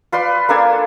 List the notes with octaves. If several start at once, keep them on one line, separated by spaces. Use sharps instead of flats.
F4 B4 D5 C6
A#3 D4 A4 G#5